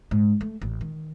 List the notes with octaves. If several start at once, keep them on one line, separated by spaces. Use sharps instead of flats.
G#2
A3
A1
D#3